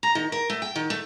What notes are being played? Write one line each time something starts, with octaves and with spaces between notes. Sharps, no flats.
A#5
D#3
A#4
A3
G5
D#3
A3